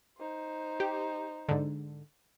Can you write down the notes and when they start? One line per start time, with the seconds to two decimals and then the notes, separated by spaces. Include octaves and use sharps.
0.18 D#4 C5
0.80 G4
1.49 G#2 D3